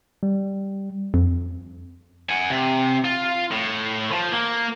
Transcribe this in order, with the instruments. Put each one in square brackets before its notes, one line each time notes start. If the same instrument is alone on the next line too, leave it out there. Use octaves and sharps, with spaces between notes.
[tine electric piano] G3
[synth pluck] F2
[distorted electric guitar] F#5 G#5
C3
F4
A2
F3
A#3